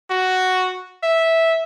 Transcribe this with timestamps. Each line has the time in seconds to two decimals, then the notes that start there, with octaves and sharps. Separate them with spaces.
0.10 F#4
1.03 E5